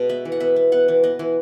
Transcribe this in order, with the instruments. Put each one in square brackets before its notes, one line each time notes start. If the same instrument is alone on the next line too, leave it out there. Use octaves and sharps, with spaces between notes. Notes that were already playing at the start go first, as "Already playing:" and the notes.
Already playing: [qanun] B2 G#3
B3 E5
E3
F#5
B3 E5
B3
B3 F#5
E3
B3 D#5
E3